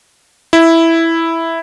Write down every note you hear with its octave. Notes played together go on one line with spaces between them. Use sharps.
E4